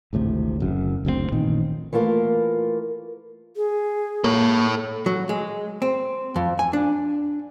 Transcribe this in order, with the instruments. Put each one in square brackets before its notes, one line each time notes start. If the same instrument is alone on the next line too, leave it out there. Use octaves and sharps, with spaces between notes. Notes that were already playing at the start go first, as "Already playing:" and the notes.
[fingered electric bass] G#1 D2 A2 C3
F#1 F#2
F#1 D2 A#2 C4
A1 A#2 D#3
[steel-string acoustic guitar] E3 A3 A#3 F4 A#4
[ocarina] G#4
[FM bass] A#3 [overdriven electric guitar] A4 C#5
[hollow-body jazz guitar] F#3
G#3
C4
F2
G#5
D4